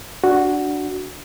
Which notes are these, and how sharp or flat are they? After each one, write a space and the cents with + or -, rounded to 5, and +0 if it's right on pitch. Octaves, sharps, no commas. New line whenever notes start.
D4 +0 F#4 +0